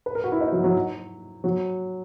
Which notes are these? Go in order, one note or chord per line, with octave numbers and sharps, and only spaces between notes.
B4
A#4
F#4
E4
D#4
F#3
F#3
F#3